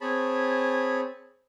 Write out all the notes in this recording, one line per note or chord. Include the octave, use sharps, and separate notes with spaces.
C4 G#4 C#5 A5 B5